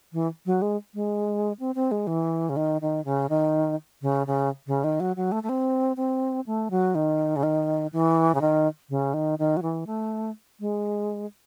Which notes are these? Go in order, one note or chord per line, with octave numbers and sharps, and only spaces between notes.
E3
F#3
G#3
G#3
C4
C4
G#3
E3
C#3
D#3
D#3
C#3
D#3
C#3
C#3
C#3
D#3
F#3
F#3
A3
A3
C4
C4
A3
F#3
D#3
C#3
D#3
E3
C#3
D#3
C#3
D#3
D#3
F#3
E3
A3
G#3